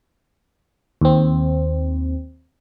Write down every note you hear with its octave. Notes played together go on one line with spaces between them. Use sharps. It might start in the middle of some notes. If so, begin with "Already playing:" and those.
D#2 C4